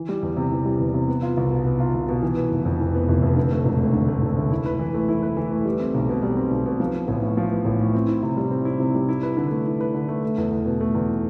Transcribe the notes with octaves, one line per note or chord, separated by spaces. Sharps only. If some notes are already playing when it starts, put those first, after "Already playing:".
Already playing: E3
G3
E2
C3
E3
G3
E2
C3
B3
F4
C2
B2
B3
F4
C2
B2
E3
B3
F1
F2
E3
B3
F1
F2
D3
A3
E1
D2
D3
A3
E1
D2
E4
B4
E3
A3
E4
B4
E3
A3
G3
C4
B1
B2
G3
C4
B1
B2
F3
B3
A1
A2
F3
B3
A1
A2
C4
E4
C3
G3
C4
E4
C3
G3
E4
B4
D3
A3
E4
B4
D3
A3
A3
E2
E2
B2
A3
E2